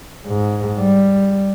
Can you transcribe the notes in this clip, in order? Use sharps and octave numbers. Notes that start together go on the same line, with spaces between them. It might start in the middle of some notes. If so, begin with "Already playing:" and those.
G#2
G3